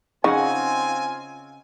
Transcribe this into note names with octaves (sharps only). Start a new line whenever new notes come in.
C#3 C4 D#4 F4 F5 F#5 G#5